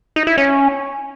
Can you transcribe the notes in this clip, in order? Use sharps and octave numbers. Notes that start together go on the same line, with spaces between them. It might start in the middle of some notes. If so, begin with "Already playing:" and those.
D#4
E4
C#4